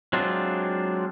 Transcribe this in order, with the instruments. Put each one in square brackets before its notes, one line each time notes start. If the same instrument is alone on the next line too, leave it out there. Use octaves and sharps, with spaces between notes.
[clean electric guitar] F#3 G#3 C4 D4 F4